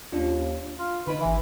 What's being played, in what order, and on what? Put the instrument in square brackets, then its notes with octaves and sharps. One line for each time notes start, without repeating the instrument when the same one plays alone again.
[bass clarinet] D#2 [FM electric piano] C#4 D4 F4
[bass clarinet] F4
[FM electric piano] D3 D#4 [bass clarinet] B4
[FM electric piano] G#1 E5 [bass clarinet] E3